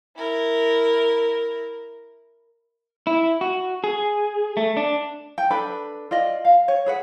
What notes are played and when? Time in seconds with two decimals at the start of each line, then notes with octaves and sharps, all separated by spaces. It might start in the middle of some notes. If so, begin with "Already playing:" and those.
0.17 E4 A#4
3.07 E4
3.41 F#4
3.84 G#4
4.57 A3
4.77 D4
5.38 G5
5.50 D4 A4 B4 B5
6.11 F4 D5 D#5
6.45 F5
6.68 C#5
6.86 G#4 B4 F#5